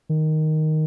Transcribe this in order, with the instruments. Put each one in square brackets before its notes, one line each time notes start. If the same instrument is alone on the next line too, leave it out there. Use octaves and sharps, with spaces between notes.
[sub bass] D#3